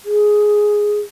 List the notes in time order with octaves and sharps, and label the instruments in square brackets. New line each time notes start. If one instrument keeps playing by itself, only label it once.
[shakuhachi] G#4